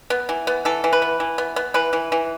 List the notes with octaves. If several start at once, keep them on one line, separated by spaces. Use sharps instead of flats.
B3
E3
B3
E3 A4
E3
B4
B3
E3
B3
B3
E3 B4
E3
E3